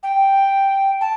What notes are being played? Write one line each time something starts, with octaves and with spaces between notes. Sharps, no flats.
G5
A5